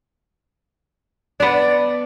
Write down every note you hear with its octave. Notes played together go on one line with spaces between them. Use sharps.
B3 D4 D5